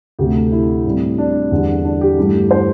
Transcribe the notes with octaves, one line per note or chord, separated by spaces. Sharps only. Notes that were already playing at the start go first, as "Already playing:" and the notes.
D2 C3 A3 G4
E4
A2 G3 C4
D4
E2 D3 G3
D4
G4
G2 E3 A3
C5